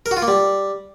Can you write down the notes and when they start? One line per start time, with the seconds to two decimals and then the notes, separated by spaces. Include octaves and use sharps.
0.06 A#4
0.11 F#4
0.17 F4
0.22 A#3
0.28 G3